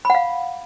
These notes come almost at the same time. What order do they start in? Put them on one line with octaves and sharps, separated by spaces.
B5 F#5 F5